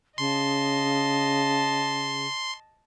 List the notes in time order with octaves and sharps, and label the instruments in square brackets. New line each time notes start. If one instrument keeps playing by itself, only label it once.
[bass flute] C#3 [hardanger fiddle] D#5 A5 [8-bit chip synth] C6